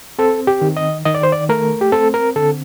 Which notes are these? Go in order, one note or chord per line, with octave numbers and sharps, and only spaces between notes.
C4 A4
G4
D#3
D#5
D#3 D#5
D5
C5
D5
A3 A#4
G4
C4 A4
A#4
D3 A4